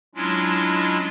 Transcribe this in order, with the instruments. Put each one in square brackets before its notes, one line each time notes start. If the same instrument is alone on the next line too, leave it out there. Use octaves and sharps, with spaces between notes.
[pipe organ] F#3 G#3 C#4 D4 E4 F4